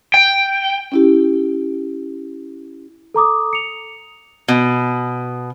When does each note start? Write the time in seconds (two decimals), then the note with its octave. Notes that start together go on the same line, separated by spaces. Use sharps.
0.14 G5
0.92 C#4 E4 G4
3.14 A4 A#5 D6 D#6
3.53 C#7 F7
4.48 B2